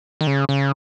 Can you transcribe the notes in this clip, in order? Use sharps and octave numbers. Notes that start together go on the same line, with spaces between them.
D#3
C#3
C#3